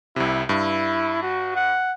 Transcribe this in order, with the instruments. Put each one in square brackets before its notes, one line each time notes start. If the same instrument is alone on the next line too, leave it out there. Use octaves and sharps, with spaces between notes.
[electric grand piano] C2 C3 [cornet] E4
[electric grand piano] G2 [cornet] E4
[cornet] F#4
F#5